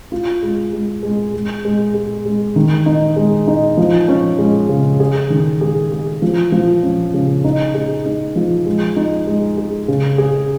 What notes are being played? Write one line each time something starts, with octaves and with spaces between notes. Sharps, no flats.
F4
G#3
G#3
G#3
G#3
G#3
G#4
G#3
D#3
D#4
G#3
D#4
F3
C#4
G#3
C#3
G#4
D#3
G#4
G#4
F3
F3
C#4
C#3
D#4
G#4
D#4
F3
G#3
D#4
G#3
G#4
C#3
G#4